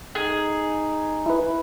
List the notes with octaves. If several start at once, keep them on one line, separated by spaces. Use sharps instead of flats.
D#4 G#4
E4 B4